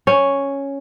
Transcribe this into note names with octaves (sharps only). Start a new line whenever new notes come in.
C#4